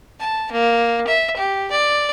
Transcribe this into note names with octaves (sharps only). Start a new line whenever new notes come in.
A5
A#3
E5
G4
D5